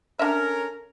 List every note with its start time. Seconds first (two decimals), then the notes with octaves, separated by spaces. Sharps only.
0.19 C#4 D4 A4 A#4 E5